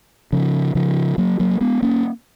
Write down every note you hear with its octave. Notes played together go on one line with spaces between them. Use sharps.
C#3 F3
C#3 F3
F#3 A#3
F#3 A#3
G#3 B3
A#3 C#4